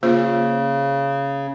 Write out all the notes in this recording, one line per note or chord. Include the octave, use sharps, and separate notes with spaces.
C#3 A#3 F4 C5